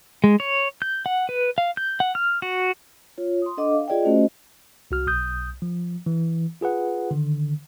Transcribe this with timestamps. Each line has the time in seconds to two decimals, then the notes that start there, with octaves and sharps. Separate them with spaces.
0.24 G#3
0.40 C#5
0.82 G6
1.06 F#5
1.29 B4
1.58 F5
1.77 G6
2.00 F#5
2.15 F6
2.42 F#4
3.18 F4 C#5
3.42 C6 D#6
3.57 D4 A4 D#5 F#5 D6
3.71 F5
3.88 F4 G#4 D5 D#5 F#5 G5
4.03 A3 C#4 F#4 C5 D#5
4.91 C2 F#4 F6
5.07 B1 D#6 G6
5.62 F3
6.06 E3
6.61 F4 G#4 B4 F#5
7.11 D3 D#3